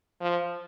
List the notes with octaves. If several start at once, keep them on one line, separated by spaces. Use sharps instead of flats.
F3